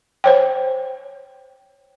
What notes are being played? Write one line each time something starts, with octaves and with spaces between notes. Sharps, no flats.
C5 C#5 G5